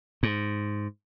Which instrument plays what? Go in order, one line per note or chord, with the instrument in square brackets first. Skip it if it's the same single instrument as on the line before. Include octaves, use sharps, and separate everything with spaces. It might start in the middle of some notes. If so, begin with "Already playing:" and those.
[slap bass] G#2